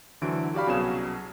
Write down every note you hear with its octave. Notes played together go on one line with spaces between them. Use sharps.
D2 D3 E3 F#3 E4 D7
F#4 G4 D5 F5 B5
C2 B2 F#3 C#4 G#4 E7